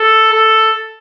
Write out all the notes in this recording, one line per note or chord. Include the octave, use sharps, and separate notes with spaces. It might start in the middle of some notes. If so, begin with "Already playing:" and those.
Already playing: A4
A4